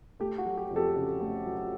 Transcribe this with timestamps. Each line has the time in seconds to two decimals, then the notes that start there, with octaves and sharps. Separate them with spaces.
0.20 A3 G4
0.38 F#4
0.46 F#3
0.58 G4
0.71 F2
0.76 G4 A4
0.96 C#3
1.20 A3
1.46 F#3